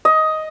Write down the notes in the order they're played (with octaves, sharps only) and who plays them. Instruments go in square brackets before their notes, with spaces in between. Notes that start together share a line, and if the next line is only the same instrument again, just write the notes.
[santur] D#5